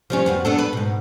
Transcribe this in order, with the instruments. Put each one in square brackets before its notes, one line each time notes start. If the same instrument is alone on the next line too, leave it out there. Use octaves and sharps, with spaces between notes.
[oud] F3 G3 C#4
F2 B3 F#4
B3 D4 A4
B4
G#2 B2